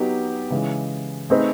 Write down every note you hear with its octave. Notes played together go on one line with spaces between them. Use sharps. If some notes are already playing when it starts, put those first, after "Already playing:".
Already playing: F#3 B3 D#4 G4
C#3 E3 G#3
A3 C4 D#4 G#4 B4